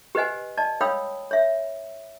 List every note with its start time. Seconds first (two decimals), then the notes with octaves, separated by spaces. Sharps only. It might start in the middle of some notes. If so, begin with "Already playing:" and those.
0.15 G4 B4 C5 D#5 F#5 G#5
0.58 D5 D#5 A5
0.81 C#5 F5 G5 B5 D#6 E6
1.31 C#5 E5